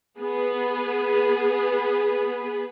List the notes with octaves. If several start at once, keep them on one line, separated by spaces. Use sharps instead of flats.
B3 G#4 B4